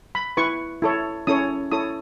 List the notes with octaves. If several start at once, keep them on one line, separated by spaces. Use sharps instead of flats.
B5
E4 B4 C#6
E4 A4 C#5
C#4 E4 A4 C#5 D#6
E4 A4 C#5 D#6